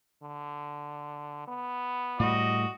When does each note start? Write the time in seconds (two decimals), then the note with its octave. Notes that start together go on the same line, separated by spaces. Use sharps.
0.23 D3
1.48 B3
2.20 A2 G3 F#4 D#5